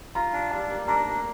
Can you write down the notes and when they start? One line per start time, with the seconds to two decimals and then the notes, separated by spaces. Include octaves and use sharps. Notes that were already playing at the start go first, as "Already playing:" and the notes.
0.15 F4 A#5
0.33 D4
0.51 G3 A5
0.69 A#3
0.87 D4 A#5
1.06 A#3